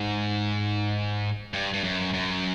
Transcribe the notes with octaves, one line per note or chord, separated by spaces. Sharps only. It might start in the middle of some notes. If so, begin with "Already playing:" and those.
Already playing: G#2
G2
G2
F#2
F#2